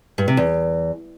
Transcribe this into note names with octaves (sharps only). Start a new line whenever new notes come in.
G2
C3
E2